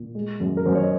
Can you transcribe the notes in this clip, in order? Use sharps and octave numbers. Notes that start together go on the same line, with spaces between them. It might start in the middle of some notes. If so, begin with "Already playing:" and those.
Already playing: A#2
G#3
F#2
A#4
F#2 C5
C#5
D#5